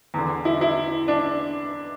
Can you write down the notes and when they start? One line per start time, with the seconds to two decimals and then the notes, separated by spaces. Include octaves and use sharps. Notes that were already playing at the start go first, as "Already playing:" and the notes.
0.14 E2 D3
0.45 E4
0.61 E4
1.08 D4